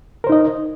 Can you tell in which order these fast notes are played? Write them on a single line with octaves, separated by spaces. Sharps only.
A#4 C5 D#4 D#5